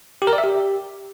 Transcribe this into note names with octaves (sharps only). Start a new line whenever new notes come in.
G4
A#4
D5
E5
G4